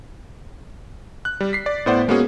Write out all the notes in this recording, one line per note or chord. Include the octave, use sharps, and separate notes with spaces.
F#6
G3
B6 C7
D5
A2 B3 C5 D5 F#5
G#3 A#3 B3 C#4 F#4 G#4